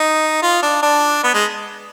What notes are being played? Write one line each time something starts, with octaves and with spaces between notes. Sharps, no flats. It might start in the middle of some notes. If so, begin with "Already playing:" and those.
Already playing: D#4
F4
D4
D4
B3
G#3